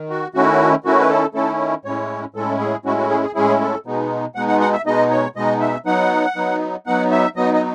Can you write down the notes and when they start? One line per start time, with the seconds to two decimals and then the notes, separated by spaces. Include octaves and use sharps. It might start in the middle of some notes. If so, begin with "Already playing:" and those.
Already playing: D#3
0.10 F#4
0.34 D#3 A3 C#4 E4 F#4
0.84 D#3 A3 C#4 E4 F#4
1.00 B4
1.09 A4
1.34 D#3 A3 C#4 E4 A4
1.85 A2 G#3 C#4 E4 C#5
2.34 A2 G#3 C#4 E4 A4
2.59 G#4
2.85 A2 G#3 C#4 E4 F#4
2.97 F#4
3.10 G#4
3.23 G#4
3.35 A2 G#3 C#4 E4 G#4
3.60 A4
3.86 B2 G#3 B3 D#4
4.35 B2 G#3 B3 D#4 F#5
4.48 F#5
4.60 F#5
4.73 E5
4.86 B2 G#3 B3 D#4 D#5
5.11 C#5
5.36 B2 G#3 B3 D#4 D#5
5.61 E5
5.86 F#3 B3 D#4 F#5
6.36 F#3 B3 D#4
6.86 F#3 B3 D#4 F#5
7.11 E5
7.36 F#3 B3 D#4 D#5
7.54 D#5